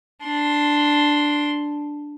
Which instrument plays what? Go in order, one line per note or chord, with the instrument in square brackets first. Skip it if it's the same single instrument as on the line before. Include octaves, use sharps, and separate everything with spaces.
[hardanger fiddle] D4 C6